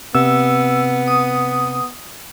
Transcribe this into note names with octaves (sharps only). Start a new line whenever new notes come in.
C3 B3 E6
D#6